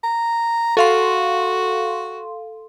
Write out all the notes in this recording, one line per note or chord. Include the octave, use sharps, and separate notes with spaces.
A#5
F#4 A4 F5 C6